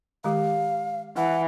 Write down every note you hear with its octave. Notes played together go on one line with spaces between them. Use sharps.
D#3 G#3 G4 F5
E3 F#5